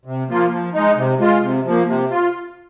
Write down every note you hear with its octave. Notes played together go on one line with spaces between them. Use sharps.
C3
F3 A#3 F4
F3
G#3 D#4
C3
G#3 F4
C3
F3 A#3
C3
F4